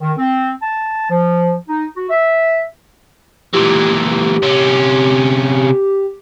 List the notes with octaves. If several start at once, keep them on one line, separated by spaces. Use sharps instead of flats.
D#3
C4
A5
F3
D#4
F#4
E5
A#2 E3 G4
C3 C#4